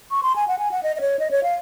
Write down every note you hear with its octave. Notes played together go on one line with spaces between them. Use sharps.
C#6
C6
G#5
F#5
G#5
F#5
D#5
D#5
C#5
D#5
C#5
F5